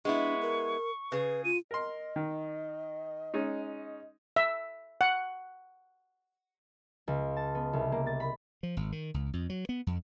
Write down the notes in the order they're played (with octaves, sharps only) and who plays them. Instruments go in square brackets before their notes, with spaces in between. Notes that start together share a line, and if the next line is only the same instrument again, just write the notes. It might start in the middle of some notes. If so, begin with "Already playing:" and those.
[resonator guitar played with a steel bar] G#3 B3 E4 [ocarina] D4 [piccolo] C#6
[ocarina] A#4
[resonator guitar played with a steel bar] C#3 G#4 [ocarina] B4
[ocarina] F4 [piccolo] D#7
[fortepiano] A#4 C6 [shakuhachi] D#5
[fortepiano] D#3
G#3 C#4 D#4
[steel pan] E5
F#5
[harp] C#2
A5
B3
C2
A#3
A6
B5
[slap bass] F3
G#1
D#3
C#2
F2
F#3
B3
F2